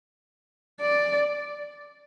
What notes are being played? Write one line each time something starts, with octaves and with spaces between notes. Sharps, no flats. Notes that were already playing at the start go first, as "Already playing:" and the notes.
D5